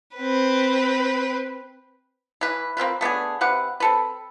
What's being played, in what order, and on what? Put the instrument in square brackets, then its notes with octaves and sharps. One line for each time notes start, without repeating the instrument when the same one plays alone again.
[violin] C4 B4
[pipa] E3 B4
A#3 C4 F4 B4
A3 B3 D4 G#4
C3 B4 F#5
C4 A4 B4